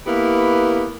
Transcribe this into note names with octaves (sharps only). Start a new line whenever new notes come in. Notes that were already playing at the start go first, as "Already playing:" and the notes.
A#3 B3 E4 G4 B4